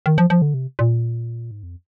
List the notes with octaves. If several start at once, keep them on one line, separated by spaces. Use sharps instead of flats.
D#3
F3
F3
D3
C3
A#2
G#2
F2